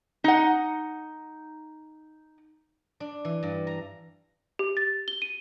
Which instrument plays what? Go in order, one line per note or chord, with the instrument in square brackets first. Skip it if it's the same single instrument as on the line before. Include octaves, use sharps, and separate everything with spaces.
[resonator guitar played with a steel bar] D#4 F#5
[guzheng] D4
E3
G2
A#5
[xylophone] G4
A6
G7
D#7